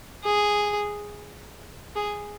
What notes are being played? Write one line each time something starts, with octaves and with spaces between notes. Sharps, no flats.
G#4
G#4